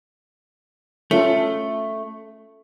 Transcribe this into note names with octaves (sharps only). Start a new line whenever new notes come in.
A3 C#4 F4 A4